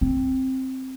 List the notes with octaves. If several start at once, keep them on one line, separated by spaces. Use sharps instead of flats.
C4